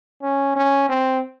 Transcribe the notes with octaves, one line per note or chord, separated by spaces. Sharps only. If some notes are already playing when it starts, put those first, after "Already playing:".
C#4
C#4
C4